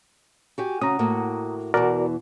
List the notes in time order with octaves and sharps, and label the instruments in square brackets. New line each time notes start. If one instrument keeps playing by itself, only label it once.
[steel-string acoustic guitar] F#4 G4 G#5
[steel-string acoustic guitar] C#3 C#4 F#4 [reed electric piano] A#5 D#6
[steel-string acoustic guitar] A2 A#3 F#4
[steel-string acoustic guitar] E2 B2 E3 [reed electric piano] F#4 A#4 D5